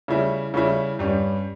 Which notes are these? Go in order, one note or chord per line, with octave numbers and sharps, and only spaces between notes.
C#3 G3 C#4 E4
C#3 G3 C#4 E4
G2 G3 C#4